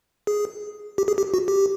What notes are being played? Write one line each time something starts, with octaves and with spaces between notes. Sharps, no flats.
G#4
G4
G#4
G4
F#4
G4